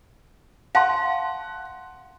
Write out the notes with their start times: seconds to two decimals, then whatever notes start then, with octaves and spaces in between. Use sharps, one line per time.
0.75 F5 F#5 A5 C6